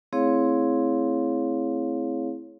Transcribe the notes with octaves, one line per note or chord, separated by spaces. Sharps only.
A3 C4 E4 G#4 C#5 F5